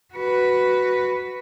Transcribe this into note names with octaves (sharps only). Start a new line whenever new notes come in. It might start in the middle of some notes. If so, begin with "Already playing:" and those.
F#4 B4